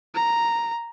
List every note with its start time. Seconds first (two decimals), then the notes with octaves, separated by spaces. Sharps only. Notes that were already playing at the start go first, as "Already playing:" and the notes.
0.15 A#5